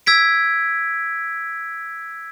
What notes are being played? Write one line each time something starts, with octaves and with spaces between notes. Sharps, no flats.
E6 G#6 B6 D7